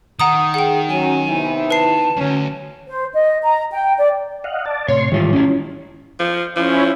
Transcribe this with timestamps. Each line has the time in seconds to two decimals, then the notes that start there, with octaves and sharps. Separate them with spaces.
0.20 D#3 F#5 A#5 D#6
0.54 G#4 F#5 G5
0.89 F#3 C#4 G#5
1.29 C3 B3 E4
1.71 B4 A5 C7
2.17 D2 G2 F#3 C#4
2.88 C5
3.14 D#5
3.43 A#5
3.73 G5
3.98 D5
4.44 D#5 F5 F#5
4.66 D5 A5
4.88 A2 C3 C#5 C6
5.12 G#2 D#3 E3 G3 F4
5.33 C#4 E4
6.20 F3
6.56 F3 C#4 E4